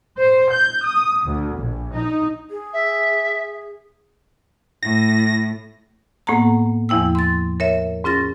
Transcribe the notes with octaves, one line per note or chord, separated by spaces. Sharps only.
C5
G6
D#6
D2
A#1
D#4
G#4
E5
A2 A#6
A2 A#3 B3 F#5 A#5
E2 F3 E4 G5 E6
C6 A6
A#4 C#5 E5
G#2 C#4 F4 A6 A#6